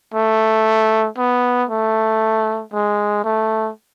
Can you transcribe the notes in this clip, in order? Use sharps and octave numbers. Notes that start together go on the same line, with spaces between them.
A3
B3
A3
G#3
A3